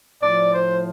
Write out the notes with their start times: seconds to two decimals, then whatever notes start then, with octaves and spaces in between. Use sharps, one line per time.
0.22 A2 F3 D5
0.54 C5